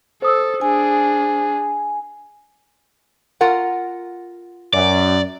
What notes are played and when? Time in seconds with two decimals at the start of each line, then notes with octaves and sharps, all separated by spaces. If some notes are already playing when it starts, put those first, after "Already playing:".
0.22 A4 C5 D#6 E6
0.61 D4 G#4 G#5
3.41 F4 A#4 F#5
4.74 F#2 D5